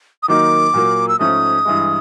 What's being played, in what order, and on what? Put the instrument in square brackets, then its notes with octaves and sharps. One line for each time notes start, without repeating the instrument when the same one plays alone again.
[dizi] D#6
[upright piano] D#3 F#3 A#3 D#4 [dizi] D6
[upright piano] A#2 F#3 A#3
[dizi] E6
[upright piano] G#2 F3 A3 C#4 [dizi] D#6
[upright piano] G2 E3 G#3